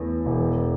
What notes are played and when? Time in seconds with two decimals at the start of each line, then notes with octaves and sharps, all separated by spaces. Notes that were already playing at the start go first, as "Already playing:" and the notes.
Already playing: E2 A2
0.26 E1